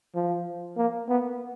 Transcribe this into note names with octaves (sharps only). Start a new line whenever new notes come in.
F3
A#3
B3